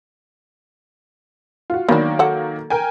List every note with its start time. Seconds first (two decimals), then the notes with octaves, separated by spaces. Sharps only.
1.70 F4 F#4
1.89 D#3 F#3 A#3 B3 D4
2.19 A4 F#5
2.70 A#4 G5 G#5